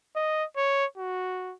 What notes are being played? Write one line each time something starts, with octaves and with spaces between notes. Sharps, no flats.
D#5
C#5
F#4